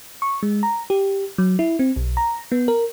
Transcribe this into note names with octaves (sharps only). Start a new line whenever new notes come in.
C#6
G#3
A#5
G4
F#3
E4
C4
B1
A#5
B3
A#4